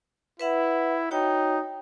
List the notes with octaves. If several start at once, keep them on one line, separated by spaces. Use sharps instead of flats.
E4 B4 E5 F#5
D#4 F#4 C#5 G5